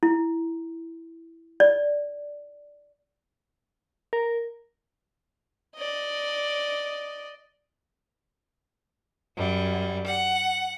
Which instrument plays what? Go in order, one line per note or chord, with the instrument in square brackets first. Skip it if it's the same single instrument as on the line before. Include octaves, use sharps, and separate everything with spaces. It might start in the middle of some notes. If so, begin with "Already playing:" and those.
[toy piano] E4
D5
[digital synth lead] A#4
[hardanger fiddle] D5 D#5
[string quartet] F#2 G3
F#5